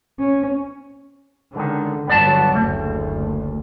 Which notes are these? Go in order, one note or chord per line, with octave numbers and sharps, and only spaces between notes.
C#4
C#2 D3 D#3
G1 G2 F#3 B3 D5 A5
F#1 D2 A3